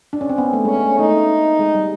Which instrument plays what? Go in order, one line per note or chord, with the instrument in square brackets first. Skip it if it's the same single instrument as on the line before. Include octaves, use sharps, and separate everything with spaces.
[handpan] D4
C#4
C4
B3
A3
[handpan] G#3 [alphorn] C#4
[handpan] A3
[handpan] A3 [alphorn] D#4
[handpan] G#3
G3